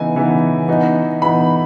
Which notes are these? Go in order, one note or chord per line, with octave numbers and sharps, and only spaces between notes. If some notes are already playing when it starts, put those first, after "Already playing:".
Already playing: C#3 E3 B3 D#4 G#5
C#3 E3 B3 D#4
E3 B3 D#4
E3 B3 D#4 B5